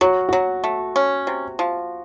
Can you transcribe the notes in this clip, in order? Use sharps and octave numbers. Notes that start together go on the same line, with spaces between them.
F#3 F#4
F#3 F#4
A3
C#4
C3
F3